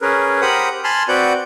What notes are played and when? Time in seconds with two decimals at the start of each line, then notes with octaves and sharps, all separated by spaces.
0.01 C#4 G#4 A#4 B4
0.42 G4 A#4 C5 F#5 B5 D#6
0.84 G#5 A5 B5 C6 F6
1.08 C4 F#4 B4 D5 F#5 G6